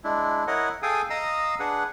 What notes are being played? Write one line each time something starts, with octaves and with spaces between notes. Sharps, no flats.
G#3 D4 E4
E4 A#4 C#5 D#5 F#5
G#4 A4 F5 G5 G#5 D#6
D#5 F5 A#5 D#6 E6
D4 G#4 B4 F#5